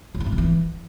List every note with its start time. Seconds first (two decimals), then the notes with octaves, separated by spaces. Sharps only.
0.15 F2
0.20 E3
0.26 G#2
0.32 C#3
0.38 E3